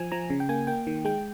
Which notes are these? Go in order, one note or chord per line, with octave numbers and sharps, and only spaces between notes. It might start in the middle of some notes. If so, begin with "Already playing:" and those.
Already playing: F3 G#5
F3 A#5
C#3
G5
A#3 G#5
A#3 G5
D#3
G#3 G5